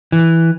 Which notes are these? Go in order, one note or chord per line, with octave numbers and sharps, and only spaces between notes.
E3